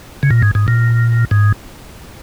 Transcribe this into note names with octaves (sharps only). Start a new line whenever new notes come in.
C#3
A#2
G#2
G#2
A#2
G#2